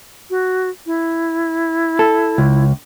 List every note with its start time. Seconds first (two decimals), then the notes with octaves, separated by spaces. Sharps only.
0.30 F#4
0.86 E4
1.99 A4
2.38 C#2